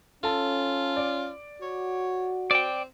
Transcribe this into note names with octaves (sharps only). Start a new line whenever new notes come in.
C#4 F4 A4 A5
D5
F#4 C#5
C4 D5 G5